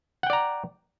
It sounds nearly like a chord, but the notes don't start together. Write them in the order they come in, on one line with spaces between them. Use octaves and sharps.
F#5 G5 D5 A#5